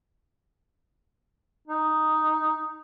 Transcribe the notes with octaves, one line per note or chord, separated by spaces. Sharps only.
D#4